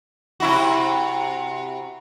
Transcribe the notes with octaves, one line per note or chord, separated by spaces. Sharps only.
C3 E4 F#4